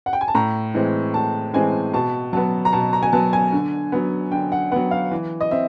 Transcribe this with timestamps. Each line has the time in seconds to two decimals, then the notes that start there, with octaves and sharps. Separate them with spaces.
0.06 F#5
0.13 G5
0.21 G#5
0.28 A5
0.35 A2 A#5
0.74 E3 G#3 C4
1.14 A2 A5
1.54 E3 G#3 C4 G#5
1.93 B2 A5
2.33 F#3 B3 A5
2.65 A#5
2.73 B2 A5
2.93 A#5
3.03 G#5
3.12 F#3 B3 A5
3.33 G#5
3.53 D3
3.92 F#3 B3
4.32 D3 G5
4.52 F#5
4.71 F#3 B3 F#5
4.91 F5
5.11 E3
5.41 D#5
5.51 C4 E5